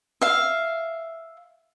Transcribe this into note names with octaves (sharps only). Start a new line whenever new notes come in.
E5 F5